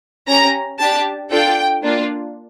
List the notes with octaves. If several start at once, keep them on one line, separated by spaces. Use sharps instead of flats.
C#4 G4 A#5
D4 G4 A5
D4 F4 A4 G5
A#3 D4 F4